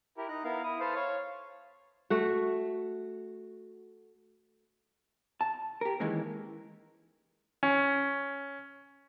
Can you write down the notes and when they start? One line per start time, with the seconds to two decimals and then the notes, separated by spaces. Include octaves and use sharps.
0.17 E4 G4 A#4
0.28 D#4 A#5 F#6
0.44 B3 E4 A#4 F5
0.64 E4 D#6
0.80 A4 B4 C5 F5
0.95 C#5 F5
2.10 A3 F#4
5.41 A5
5.81 G4 A#4
6.00 D#3 E3 G#3 A#3 C#4
7.63 C#4